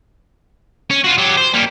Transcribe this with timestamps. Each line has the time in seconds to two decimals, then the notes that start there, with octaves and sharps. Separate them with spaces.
0.91 C#4
1.04 F4 F#4
1.18 F#3 G4
1.37 C5
1.54 G3 A#3